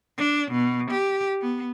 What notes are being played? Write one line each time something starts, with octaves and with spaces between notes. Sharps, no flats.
D4
B2
G4
B3